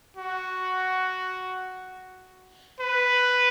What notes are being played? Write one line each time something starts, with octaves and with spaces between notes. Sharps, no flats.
F#4
B4